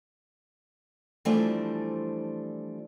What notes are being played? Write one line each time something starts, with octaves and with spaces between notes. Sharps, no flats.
E3 F3 G3 A3 C4 D4